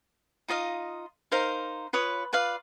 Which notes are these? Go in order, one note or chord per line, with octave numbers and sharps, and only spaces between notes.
D#4 F4 D#5 F5
D#4 A#4 C5 F5
F4 B4 C#5 D#6
F4 B4 D5 F5